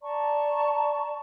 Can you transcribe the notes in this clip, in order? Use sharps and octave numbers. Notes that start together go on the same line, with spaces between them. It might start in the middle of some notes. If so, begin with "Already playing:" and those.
D5 A5 A#5 C#6